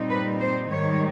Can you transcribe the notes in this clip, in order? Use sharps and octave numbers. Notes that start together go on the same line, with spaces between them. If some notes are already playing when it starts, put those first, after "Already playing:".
Already playing: A#2 G3 C4 D#4
B4
C5
G#2 D#3 G3 C#5